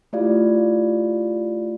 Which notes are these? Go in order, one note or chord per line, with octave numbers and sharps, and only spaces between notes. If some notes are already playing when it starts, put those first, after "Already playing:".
A3 E4 F4 G4 D5 F5